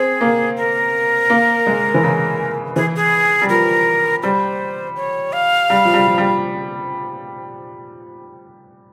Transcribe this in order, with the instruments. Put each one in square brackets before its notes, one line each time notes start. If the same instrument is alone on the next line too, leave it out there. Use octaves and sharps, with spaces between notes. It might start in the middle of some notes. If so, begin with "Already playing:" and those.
Already playing: [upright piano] C4 [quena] G#4
[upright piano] A#3
[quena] A#4
[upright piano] A#3
G#3
E3
C#3
[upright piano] E3 [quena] G#4
[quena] G#4
[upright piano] G3
[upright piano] F3 [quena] A#4
[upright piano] G3 [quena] C5
[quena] C#5
F5
[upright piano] G3
F3
G3
F3
G3